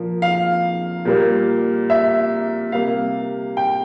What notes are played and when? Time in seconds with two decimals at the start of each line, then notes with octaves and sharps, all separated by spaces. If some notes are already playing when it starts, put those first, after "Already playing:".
Already playing: A#2 F3 A#3
0.22 F5
1.05 A#2 G3 A#3
1.90 E5
2.72 C3 G3 A#3 F5
3.57 G5